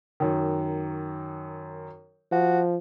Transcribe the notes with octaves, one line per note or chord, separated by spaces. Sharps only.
F#2 D#3
F3 F#4